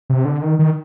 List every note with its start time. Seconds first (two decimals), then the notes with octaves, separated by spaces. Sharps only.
0.10 C3
0.25 D3
0.42 D#3
0.59 D#3